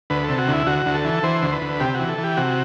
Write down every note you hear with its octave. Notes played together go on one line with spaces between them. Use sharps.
D2 B4
A4
C3
F#4
D2 E4
D2 F#4
D2
A4
E3
E3 C5
D2
B4
D2
C3 G4
F#4
E3
A4
E3
G4
C3 F#4